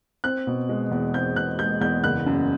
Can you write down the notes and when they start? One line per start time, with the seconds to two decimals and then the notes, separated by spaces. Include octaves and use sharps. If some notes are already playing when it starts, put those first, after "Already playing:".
0.24 C4 F#6
0.47 B2
0.69 G#3
0.91 E2
1.14 C4 G6
1.36 B2 F#6
1.59 G#3 G6
1.81 E2 G6
2.04 F#1 F#6
2.26 F#2